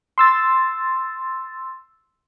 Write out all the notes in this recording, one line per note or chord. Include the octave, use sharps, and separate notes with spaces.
C6 E6 A6